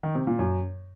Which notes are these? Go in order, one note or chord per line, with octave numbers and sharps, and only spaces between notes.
D#3
C3
A#2
F#2